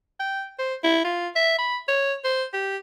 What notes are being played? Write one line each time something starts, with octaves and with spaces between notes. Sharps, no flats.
G5
C5
E4
F4
E5
B5
C#5
C5
G4